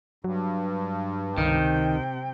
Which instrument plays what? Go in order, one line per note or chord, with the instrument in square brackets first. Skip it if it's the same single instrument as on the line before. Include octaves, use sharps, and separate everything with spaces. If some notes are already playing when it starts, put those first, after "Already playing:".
[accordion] G2 [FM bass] F#3
[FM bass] C#2 [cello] C3 G5 [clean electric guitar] D#3